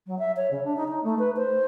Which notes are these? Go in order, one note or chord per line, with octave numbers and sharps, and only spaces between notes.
F#3
E5
C#5
C#3
D4
D#4
D#4
A3
B4
C5